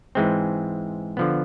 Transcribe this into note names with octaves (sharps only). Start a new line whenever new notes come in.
G#2 E3 G#3 C4
D3 F3 B3